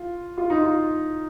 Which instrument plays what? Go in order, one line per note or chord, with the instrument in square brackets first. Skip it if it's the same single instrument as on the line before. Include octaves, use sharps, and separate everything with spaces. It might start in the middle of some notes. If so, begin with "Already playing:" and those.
Already playing: [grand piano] F4
F4
D#4
F4